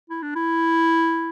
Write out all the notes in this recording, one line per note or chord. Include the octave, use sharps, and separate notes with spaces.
E4
D4
E4